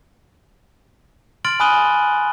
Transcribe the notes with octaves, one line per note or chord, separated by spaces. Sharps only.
C6 F6 A6 D7 F#7
G#5 B5 D#6 F#6 D#7 G7